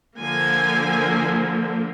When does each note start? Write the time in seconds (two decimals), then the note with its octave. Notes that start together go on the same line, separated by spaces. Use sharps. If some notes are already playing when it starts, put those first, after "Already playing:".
0.20 D3 F3 A#3 G#5